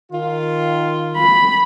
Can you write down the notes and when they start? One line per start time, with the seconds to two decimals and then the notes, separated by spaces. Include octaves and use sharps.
0.12 D#3 F4
1.17 B5